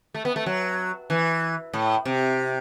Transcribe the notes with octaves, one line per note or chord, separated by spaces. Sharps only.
A3
B3
A3
F#3
E3
A2
C3